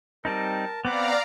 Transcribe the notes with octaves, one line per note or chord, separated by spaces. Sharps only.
G3 C4 D#4 A#4 A5
B3 C4 B4 D5 F5 F#5 A#5 D6